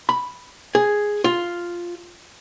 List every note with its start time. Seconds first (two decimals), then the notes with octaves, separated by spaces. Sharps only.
0.09 B5
0.75 G#4
1.24 F4